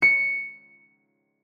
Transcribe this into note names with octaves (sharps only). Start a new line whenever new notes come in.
C#7